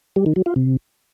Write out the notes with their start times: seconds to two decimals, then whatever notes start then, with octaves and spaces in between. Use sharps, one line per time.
0.16 G3
0.26 D#3
0.36 F#3
0.46 F4
0.56 C3